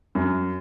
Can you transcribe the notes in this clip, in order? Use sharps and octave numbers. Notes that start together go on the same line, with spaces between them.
F#2